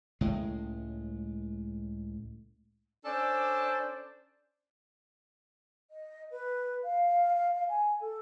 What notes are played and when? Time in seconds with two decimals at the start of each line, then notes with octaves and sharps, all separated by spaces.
0.21 C#2 A2 G#3
3.05 C#4 D4 A4 C5 D5
5.91 D#5
6.31 B4
6.84 F5
7.35 F5
7.55 F5
7.69 G#5
8.01 A4